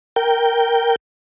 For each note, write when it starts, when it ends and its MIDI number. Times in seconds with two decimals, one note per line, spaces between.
0.16 0.96 70
0.16 0.96 79